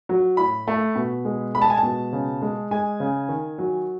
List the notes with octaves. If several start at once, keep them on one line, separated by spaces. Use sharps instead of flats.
F#3
A2 B5
A3
B2
G#3
G#3 B5
A5
G#5
A5
B2
C#3
G#3
G#3 G#5
C#3
D#3
F#3